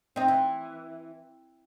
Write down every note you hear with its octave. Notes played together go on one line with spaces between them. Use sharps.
C4 D#4
E3